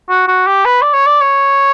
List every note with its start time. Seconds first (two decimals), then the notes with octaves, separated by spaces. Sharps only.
0.10 F#4
0.28 F#4
0.47 G4
0.65 B4
0.82 D5
0.94 C#5
1.07 D5
1.21 C#5